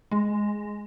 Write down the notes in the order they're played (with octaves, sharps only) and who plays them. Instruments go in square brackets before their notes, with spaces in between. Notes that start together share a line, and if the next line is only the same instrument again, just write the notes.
[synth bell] G#3